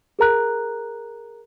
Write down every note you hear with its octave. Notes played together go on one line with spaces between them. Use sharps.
G#4 A#4 A#5 F#6